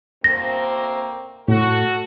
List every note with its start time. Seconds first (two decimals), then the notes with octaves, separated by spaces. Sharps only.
0.24 D2 A#3 C4 A#6
1.48 A2 F#4 A4